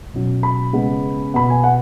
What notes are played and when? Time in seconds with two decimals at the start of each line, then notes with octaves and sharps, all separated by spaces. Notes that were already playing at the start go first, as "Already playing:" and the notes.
0.13 B2 F#3 C#4
0.43 B5
0.73 C#3 G#3 B3
1.34 B2 B3 B5
1.50 G#5
1.64 F#5